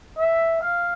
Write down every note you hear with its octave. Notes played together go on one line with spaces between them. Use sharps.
E5
F5